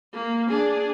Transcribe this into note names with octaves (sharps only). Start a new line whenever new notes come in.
A#3
D4 G#4